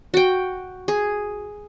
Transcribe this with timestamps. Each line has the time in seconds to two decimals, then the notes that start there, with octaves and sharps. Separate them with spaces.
0.14 F#4 G5
0.88 G#4